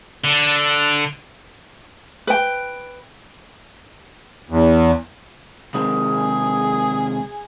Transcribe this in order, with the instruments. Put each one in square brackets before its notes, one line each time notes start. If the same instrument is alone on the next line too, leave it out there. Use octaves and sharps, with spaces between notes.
[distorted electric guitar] D3
[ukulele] B4 G5
[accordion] E2
[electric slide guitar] C3 D#3 G#3 [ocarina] D#6
[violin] G#4